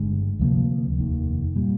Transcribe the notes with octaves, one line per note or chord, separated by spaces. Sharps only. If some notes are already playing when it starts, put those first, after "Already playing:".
Already playing: G1 G2 D3 G#3
D2 C3 F3 A#3
F1 D#2 D#3
A#2 G3